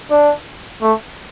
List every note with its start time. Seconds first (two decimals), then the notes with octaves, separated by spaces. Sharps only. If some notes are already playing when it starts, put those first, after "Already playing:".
0.11 D4
0.82 A3